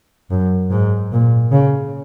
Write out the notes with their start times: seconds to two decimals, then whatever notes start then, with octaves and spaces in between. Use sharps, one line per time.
0.31 F#2
0.71 G#2
1.12 A#2
1.52 C#3